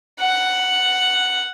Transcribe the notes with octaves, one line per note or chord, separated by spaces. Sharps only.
F#5